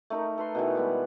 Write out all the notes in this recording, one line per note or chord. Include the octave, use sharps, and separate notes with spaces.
A3 D#4 A#4
A4 B4 C6
B2 D#3 E3
G3 G#3 B3